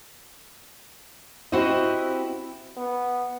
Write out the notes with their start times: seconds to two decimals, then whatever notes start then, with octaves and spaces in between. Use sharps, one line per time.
1.52 C4 E4 F#4 G4 C5 D#5
2.77 B3